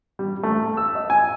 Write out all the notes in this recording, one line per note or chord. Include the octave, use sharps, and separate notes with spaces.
G3
A3
E6
D#5
G#5